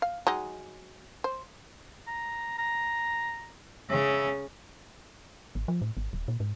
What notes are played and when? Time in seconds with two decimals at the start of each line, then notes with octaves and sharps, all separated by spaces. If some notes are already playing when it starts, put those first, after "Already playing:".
0.02 F5
0.27 F#3 G#3 D#4
1.24 C5
2.07 A#5
2.58 A#5
3.90 C#3 C#4 E5
5.55 G#1
5.68 F3
5.82 A2
5.97 G#1
6.13 D#1
6.28 A#2
6.40 G#2